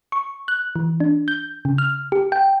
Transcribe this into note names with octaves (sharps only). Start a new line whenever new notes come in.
C#6
F#6
E3
D4
G6
C#3
F6
G4
G5